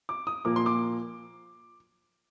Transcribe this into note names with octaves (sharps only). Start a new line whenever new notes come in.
D6
D#6
A#2 F3 A#3 D6
C6
D6